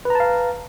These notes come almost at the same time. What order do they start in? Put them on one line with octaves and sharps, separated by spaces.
B4 A#5 A5 F5